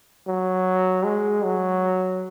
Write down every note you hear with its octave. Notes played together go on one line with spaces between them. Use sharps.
F#3
G#3
F#3